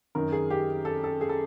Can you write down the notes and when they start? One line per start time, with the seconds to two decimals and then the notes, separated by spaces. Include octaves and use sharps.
0.15 F#2 D#3 A#4
0.32 G#4
0.50 G4
0.85 A4
1.04 A4
1.21 G#4
1.29 A4